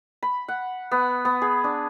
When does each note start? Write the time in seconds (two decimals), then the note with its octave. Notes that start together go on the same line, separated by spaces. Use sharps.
0.23 B5
0.48 F#5
0.92 B3
1.25 B3
1.42 G#4
1.64 D4